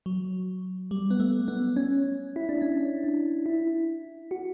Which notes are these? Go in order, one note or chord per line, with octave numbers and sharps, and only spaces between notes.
F#3
G3
B3
A3
B3
C#4
E4
D4
C#4
D4
E4
F#4